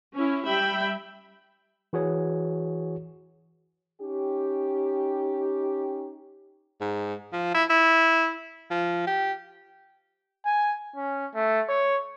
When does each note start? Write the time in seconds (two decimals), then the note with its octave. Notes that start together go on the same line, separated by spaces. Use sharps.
0.15 C#4 E4
0.45 G3 E5 G5 B5
1.93 E3 F#4 G#4 C#5
4.01 C#4 D#4 G4
6.81 G#2
7.33 F3
7.54 E4
7.70 E4
8.71 F3
9.07 G4
10.45 G#5
10.96 C#4
11.35 A3
11.69 C#5